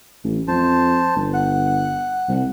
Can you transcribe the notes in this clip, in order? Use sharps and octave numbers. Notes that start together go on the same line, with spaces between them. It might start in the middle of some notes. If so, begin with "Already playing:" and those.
A1
F2 C5 A5
G1
F#5
C2